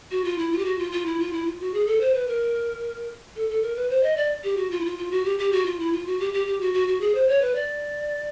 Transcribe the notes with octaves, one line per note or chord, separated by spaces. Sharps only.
F#4
F4
E4
F4
G4
F#4
F4
F4
E4
F4
E4
F4
F#4
G#4
A4
C5
B4
A#4
A4
A4
A#4
B4
C5
D#5
D5
G4
F#4
F4
E4
F4
F4
F#4
G4
G4
F#4
F4
E4
F4
F#4
G4
G4
G4
F#4
F#4
F#4
G#4
C5
C#5
B4
D5